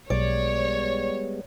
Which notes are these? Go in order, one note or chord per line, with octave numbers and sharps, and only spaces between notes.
B1 G3 G#3 B3 C#5 D5